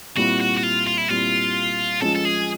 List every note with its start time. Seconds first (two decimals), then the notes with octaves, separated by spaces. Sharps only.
0.16 A#2 G3 C4 E4 F#4
0.40 F#4
0.57 F#4
0.63 F4
0.87 F4
0.98 E4
1.09 A#2 G3 C4 E4 F4
2.01 F3 G#3 C#4 A4
2.15 A4
2.25 G#4